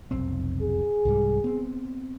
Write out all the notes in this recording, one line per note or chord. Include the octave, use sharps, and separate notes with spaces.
F1 B1 C4
G#4
C2 G#2 G3
B3 C4